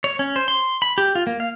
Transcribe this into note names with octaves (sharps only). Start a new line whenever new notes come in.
C#5
C#4
C5
C6
B5
G4
F4
A#3
F5